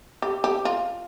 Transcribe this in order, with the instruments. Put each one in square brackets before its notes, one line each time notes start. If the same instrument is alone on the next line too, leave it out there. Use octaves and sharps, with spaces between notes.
[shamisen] G4
G4
F4